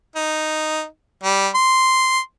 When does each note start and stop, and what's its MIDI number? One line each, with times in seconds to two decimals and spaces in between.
0.16 0.84 63
1.23 1.48 55
1.55 2.19 84